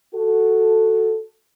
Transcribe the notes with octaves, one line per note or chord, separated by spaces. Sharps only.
F#4 A4